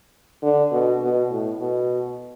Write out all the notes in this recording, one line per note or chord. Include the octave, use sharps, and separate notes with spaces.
D3
B2
B2
A2
B2